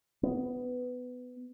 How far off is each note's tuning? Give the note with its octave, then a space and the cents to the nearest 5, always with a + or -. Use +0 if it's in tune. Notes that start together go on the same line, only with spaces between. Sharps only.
B3 +15